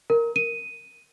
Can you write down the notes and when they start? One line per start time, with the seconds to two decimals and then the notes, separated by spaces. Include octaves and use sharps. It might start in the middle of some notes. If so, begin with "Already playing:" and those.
0.10 A#4
0.36 D#7